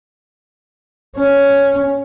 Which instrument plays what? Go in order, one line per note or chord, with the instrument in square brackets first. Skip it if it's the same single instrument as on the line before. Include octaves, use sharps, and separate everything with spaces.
[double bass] C#4